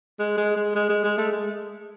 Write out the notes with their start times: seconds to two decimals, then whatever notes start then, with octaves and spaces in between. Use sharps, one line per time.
0.19 G#3
0.37 G#3
0.56 G#3
0.75 G#3
0.89 G#3
1.04 G#3
1.18 A3
1.32 G#3